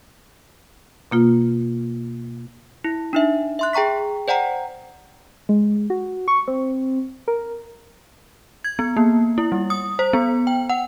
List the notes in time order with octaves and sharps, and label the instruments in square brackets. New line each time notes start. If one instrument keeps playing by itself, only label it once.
[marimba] B2 A#3 F4
[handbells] E4
D4 D#4 E5
E5 C6 F#6
G#4 G5 A#5 C#6 B6
C5 D5 F#5 G5 A#5
[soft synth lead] G#3
F#4
C#6
C4
A#4
[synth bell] G#6
B3
A#3
E4
G3
D#6
C5
B3
G5
F#5